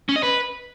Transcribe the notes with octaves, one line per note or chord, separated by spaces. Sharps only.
C#4
D#5
B4